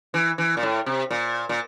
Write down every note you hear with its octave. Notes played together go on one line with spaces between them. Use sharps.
E3
E3
A#2
A2
C3
A#2
A#2